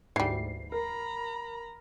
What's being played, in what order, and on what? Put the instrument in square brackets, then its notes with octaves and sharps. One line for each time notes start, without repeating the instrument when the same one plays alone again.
[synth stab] D2 G#2 [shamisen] E3 G3 [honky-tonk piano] C7
[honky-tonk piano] A#4 [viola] A#5 B5